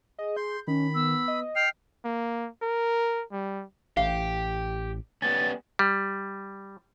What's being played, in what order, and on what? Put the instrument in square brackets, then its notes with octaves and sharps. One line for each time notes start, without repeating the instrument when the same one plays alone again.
[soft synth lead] G#4 [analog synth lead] D#5
[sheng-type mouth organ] C6 [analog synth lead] G6
[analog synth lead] D#3 [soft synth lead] C#4 [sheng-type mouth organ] B5
[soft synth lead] B3 [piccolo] E6
[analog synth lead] D#5
[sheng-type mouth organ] G5 F6 [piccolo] C7
[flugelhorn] A#3
A#4
G3
[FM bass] A1 [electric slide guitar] G4 [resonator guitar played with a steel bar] F5
[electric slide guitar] G3 B3 C#4 [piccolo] A6
[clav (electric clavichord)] G3